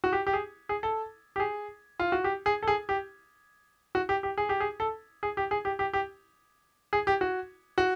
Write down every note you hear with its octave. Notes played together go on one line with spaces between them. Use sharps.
F#4
G4
G4
G#4
G#4
A4
G4
G#4
F4
F#4
G4
G#4
A4
G#4
G4
F#4
G4
G4
G#4
G4
G#4
A4
G#4
G4
G#4
G4
G4
G4
G#4
G4
F#4
F#4